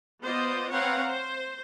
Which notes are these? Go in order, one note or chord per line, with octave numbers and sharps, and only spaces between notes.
B3 F4 C5 D5 D#5
C4 B4 C#5 F5 F#5 A#5
C5